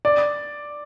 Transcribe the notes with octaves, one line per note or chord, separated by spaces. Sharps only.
D5